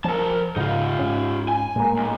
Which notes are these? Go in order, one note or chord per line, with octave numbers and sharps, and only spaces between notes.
F3 A#4 A5
G#2 C#3 D#4 F4
G#2 C#4
G#5
A2 G#3 A#3
B1